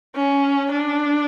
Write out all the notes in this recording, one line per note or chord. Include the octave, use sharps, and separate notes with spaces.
C#4
D4